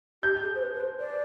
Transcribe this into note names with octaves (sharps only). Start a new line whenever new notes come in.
G4 G6
G#4
C5
B4
B4
C5
D5